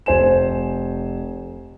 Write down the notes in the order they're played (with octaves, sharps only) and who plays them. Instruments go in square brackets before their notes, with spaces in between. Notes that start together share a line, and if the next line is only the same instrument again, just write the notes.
[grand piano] F1 C5 G#5 E7